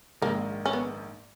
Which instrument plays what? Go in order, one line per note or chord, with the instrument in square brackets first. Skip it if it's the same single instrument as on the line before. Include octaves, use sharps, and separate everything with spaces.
[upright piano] A#1 G#2 D#3 [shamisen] A#3
[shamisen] C#4
B3